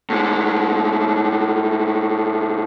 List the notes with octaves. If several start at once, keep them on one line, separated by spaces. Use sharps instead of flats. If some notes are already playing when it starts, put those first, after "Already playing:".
A2 G#3